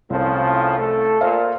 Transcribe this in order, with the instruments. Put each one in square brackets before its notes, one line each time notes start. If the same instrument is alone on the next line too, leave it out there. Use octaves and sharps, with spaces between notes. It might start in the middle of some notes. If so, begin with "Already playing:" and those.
[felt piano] C2 [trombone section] A2 C#3 F3
[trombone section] A3 A4
[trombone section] A#2 [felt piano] A#4 C5 F5